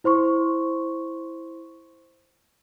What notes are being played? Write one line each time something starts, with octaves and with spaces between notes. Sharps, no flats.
E4 C5 C6 C#6